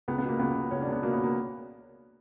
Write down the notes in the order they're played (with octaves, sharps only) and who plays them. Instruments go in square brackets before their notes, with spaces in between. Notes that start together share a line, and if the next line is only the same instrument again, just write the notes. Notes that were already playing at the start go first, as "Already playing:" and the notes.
[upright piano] C#2 B3
B3
B2 A#3
C#2 B3
C#2
C#2 C#4
D4
C#2
B3
B2 A#3
B3
B2
A#3